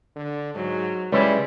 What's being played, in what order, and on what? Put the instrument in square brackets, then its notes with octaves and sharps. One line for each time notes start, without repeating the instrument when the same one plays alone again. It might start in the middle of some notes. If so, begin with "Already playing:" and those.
[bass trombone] D3
[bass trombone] G#2 [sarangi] F#3
[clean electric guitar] C#2 E4 [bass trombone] G3 [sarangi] G#3 [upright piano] B4 C#5 D5